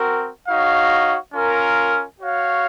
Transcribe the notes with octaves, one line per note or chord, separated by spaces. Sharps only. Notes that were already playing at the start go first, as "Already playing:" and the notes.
Already playing: C4 F#4 A#4
D#4 F#4 C#5 F5
C#4 F4 A#4
F#4 C#5 F5